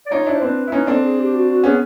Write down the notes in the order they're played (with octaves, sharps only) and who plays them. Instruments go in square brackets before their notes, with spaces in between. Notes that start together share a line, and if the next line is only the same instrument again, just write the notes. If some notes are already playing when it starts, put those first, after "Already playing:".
[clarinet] D5
[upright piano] D#4 F4 [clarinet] C#5
[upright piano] D4 E4
[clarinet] C5
[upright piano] C4 D4 [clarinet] B4
[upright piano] E4
[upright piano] C#4 D#4 [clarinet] B4
[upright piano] C4 D4 [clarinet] A4
[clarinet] G#4
G4
F#4
F#4
[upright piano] B3 C#4 [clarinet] G#4